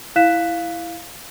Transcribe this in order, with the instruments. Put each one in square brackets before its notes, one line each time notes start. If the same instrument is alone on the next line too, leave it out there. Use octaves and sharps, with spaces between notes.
[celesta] E4 F5 F#6 B6 E7